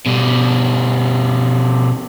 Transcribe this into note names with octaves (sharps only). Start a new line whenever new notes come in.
B2 G3